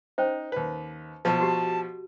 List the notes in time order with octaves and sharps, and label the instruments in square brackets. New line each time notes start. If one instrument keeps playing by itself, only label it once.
[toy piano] C#4 C5 [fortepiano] D#4
[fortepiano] D#2 B4
[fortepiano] B2 F3 [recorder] A5
[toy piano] F#4 G4